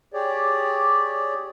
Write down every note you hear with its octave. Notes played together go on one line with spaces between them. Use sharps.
G4 G#4 C#5 D5